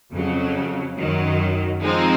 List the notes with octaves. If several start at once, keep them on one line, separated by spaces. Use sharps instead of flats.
F2 C#3 F#3
F#2 D#3 F#3
F3 G#3 C4 D#4